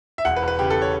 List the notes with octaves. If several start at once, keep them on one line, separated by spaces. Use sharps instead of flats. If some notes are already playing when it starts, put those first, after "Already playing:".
E5
E1 F#5
B4
E1
B4
C#3 G4
A4
C#5